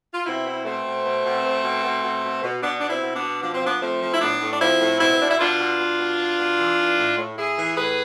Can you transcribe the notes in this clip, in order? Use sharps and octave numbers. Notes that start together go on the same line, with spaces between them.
F4
B2 C4 E4
B2
B2 A3 C4
B2
B2
B2
B2
B2
B2
B2
B2
B2
B2 B3 D4
B2 D4
C4 E4
B2
B3 D4
B2
F3 D4
C4
F3 B3 D4
F3 A3 C4
F3
E4
A2 B3 D4
A2
D4
F3 C4 E4
A2
B2 C4 E4
C4
B2 D4
E4
B2 D4 F4
B2
B2
B2
B2
B2
E3
E3
A2
A2
A2 E4 G#4
E3
A2 G#4 B4